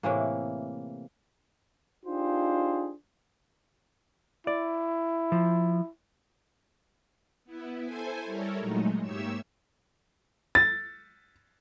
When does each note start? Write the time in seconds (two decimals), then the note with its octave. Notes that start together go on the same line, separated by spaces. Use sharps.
0.03 A2 C3 E3 A#3
2.06 D4 D#4 F4 G4 G#4 C5
4.47 E4 D5
5.32 F3
7.45 B3 E4
7.83 E4 A4 C5 G#5
8.25 G3 E4 A4 A#4 C#5
8.58 A#2 F#3 G#3 A3 D#4
9.01 G#2 A#3 G4 C#5 E5 E6
10.55 A6